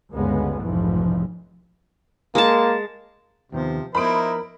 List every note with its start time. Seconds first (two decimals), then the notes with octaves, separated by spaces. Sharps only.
0.13 G1 D2 G2 C#3 G#3 B3
0.61 F1 B1 F2 G#2 E3 F3
2.35 G#3 A#3 A5
3.52 D#2 C3 D#3 F3 B3
3.95 F3 B3 D#4 E4 A#4 C5 B5 D7